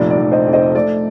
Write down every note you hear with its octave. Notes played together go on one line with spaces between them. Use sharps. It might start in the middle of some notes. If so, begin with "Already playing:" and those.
Already playing: F1 A#1 D5
D5
F1
C5 D#5
F2
C5 D#5
A3 D5